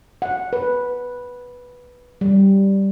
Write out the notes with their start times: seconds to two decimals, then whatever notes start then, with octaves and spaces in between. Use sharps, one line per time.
0.22 F#5
0.53 B4
2.21 G3